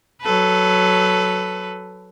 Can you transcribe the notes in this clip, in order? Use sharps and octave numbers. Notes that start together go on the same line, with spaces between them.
F#3 A4 B4